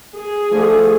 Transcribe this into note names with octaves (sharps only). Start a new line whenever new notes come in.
G#4
D3 F3 A3